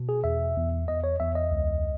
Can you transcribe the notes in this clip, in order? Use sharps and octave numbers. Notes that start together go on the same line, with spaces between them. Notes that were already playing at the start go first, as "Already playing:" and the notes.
Already playing: B2
G#4
E2 E5
E2
E2 D#5
C#5
E2 E5
D#5
C#2